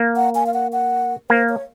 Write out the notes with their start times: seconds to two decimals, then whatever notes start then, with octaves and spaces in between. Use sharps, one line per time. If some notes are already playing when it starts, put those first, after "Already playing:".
Already playing: A#3
0.16 F#5
0.35 G#5
0.46 F5
0.54 F#5
0.73 F#5
1.30 A#3 C5
1.49 C#5